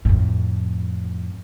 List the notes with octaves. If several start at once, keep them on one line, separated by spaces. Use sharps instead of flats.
F2 A2